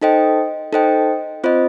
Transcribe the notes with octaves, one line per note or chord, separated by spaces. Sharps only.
D#4 A4 C5 D#5 G5
D#4 A4 C5 D#5 G5
C4 F4 C5 D#5